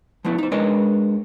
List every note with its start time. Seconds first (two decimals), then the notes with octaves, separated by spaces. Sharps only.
0.25 F3 A3 B3 E4
0.38 D#4 C5
0.51 G#3 D4 A#4 B4 C#5 D#5